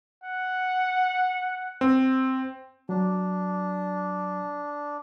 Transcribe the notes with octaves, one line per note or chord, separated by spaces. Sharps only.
F#5
C4
F#3 D4